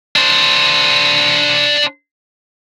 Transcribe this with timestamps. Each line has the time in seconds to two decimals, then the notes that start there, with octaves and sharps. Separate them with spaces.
0.16 D4 C5